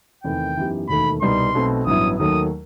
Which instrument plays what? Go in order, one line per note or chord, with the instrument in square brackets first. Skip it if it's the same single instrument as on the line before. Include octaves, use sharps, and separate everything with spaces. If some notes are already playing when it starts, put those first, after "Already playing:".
[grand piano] E2 C3 D#3 A3 [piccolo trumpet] G5
[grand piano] F#2 E3 B3 D#4 G4
[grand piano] E1 D#2 D#3 A3 [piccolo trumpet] B5
[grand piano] C2 B2 G3 B3 D#4 [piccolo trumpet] C6
[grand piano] B1 B2 A3 C4
[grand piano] A1 G2 F#3 B3 E4 [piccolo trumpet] D#6
[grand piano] D#2 D#3 F#3 A3 [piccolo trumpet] D#6